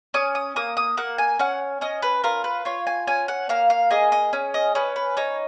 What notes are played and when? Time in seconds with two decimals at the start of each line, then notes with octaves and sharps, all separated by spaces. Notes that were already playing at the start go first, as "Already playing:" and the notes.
0.14 C#4 D#6
0.35 D#6
0.56 A#3 D#6
0.77 D#6
0.97 A#3 F#5
1.18 G#5
1.39 C#4 F#5
1.81 C#4 D#5
2.02 B4
2.24 F4 A#4
2.44 B4
2.65 F4 C#5
2.87 G#5
3.07 C#4 G#5
3.28 F#5
3.49 A#3 F5
3.70 F5
3.91 G#4 D#5
4.12 D#5
4.33 C#4
4.54 D#5
4.75 C#4 B4
4.96 B4
5.17 D#4 C#5